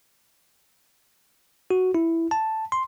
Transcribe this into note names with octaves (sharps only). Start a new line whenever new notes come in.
F#4
E4
A5
C6